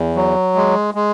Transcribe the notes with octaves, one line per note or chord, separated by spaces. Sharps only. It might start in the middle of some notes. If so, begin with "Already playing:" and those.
Already playing: E2
F#3
G#3
G#3